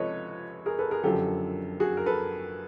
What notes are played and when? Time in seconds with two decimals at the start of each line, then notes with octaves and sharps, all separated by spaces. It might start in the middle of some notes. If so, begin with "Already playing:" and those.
Already playing: C#2 C3 F3 A4 B4 C#5 D#5
0.66 G#4 A#4
0.79 A4 B4
0.91 G#4 A#4
1.03 F#1 F#2 D3 F3 G4 A4
1.80 F#4 G#4
1.97 A#4
2.06 A4 B4